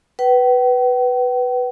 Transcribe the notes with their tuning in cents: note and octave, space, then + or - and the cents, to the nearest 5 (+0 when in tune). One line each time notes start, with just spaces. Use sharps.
B4 +0 G5 -45